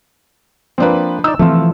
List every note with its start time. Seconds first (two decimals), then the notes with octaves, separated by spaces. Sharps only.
0.78 F3 A#3 C4 D4 B4
1.24 D#4 D5 E6
1.39 C3 E3 F3 A3 F4